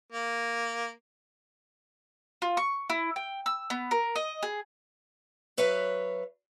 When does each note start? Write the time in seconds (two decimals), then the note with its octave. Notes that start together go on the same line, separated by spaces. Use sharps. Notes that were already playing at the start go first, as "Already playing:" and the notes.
0.13 A#3
2.42 F4
2.57 C#6
2.90 E4
3.16 G5
3.46 E6
3.70 B3
3.91 A#4
4.16 D#5
4.43 G#4
5.57 F#3 B4 C#5 E5 F5